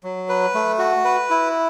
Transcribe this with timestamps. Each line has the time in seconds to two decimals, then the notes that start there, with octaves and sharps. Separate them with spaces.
0.04 F#3
0.29 B4
0.55 A3
0.79 F#4
1.05 B4
1.30 E4